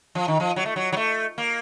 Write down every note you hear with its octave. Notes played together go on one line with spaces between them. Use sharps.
F3
D#3
F3
F#3
A3
F#3
F#3
A3
A#3